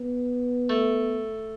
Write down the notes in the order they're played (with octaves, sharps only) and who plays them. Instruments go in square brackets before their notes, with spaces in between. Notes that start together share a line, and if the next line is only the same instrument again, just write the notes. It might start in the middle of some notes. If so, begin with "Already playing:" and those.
Already playing: [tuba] B3
[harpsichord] A3